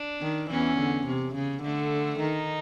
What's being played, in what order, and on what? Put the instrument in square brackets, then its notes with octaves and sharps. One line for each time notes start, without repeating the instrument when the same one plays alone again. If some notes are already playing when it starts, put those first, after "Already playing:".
Already playing: [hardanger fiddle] D4
[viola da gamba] D#3
[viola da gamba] E2 E3 [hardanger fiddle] C#4
[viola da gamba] D3
C3
C#3
[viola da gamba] D3 [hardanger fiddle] A3
[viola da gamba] D#3 [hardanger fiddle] D#4